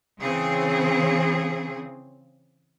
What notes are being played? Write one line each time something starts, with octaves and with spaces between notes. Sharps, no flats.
C#3 E3 C4 G#4